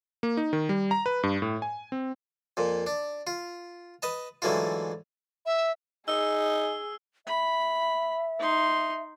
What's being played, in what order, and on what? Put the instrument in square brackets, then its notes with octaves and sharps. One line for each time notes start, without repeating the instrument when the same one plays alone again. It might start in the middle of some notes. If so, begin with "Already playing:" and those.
[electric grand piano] A#3
D#4
D#3
G3
A#5
B4
G2
A2
G#5
C4
[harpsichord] F2 A#2
D4
F4
B4 D#5 A5
G#2 D3 E3 F#3 A3 F4
[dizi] E5
[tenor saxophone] D#4 [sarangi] G#4 [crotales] E6
[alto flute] E5 [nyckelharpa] B5
[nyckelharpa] D#4 C6